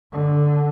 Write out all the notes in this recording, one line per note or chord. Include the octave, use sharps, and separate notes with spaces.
D3